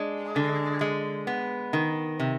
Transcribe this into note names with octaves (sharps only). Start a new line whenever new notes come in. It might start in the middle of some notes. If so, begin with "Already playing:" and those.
Already playing: G#3 D4
D3
G#3
B3
D#3
C3